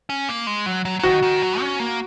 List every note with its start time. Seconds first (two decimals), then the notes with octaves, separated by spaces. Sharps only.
0.10 C#4
0.29 A#3
0.47 G#3
0.66 F#3
0.85 F#3
0.99 F#3
1.03 D#3 F#4
1.22 D#3
1.42 F#3
1.61 C#4
1.79 A#3